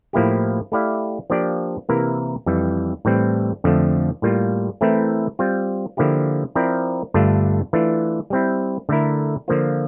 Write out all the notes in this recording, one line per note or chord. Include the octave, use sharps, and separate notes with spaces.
A2 F3 A#3 E4 G4
A3 E4 G4 D5 F5
F3 A#3 D4 G4 D5
C3 E3 A#3 E4 A#4
F2 E3 G3
A2 E3 G3 C4
F2 D3 F3 A3
A2 G3 A#3 F4
E3 A3 C4 E4 A#4
G3 C4 F4
D3 F3 A#3 E4 G4
F3 C4 E4 A#4 D5
G2 D3 A3 D4 F4
E3 A3 D4 F4
G3 C4 E4
D3 A3 E4 A#4
D3 F3 A#3 F4 C5